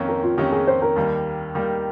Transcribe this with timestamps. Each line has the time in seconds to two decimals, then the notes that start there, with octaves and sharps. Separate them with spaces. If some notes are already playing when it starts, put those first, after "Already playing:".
Already playing: F2 D#3 A#3 C#4
0.09 A#4
0.23 F4
0.37 F2 D#3 A#3 C#4 G4
0.52 G#4
0.67 C5
0.82 A#4
0.96 D#2 D#3 G3 A#3
1.54 D#2 D#3 G3 A#3